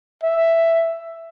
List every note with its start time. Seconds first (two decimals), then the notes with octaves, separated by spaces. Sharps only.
0.23 E5